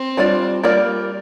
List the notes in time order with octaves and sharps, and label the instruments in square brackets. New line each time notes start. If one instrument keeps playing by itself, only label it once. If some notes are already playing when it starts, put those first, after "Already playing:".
Already playing: [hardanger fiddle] C4
[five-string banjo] G3 D4 F4 D5
G3 A#3 F4 A#4 D5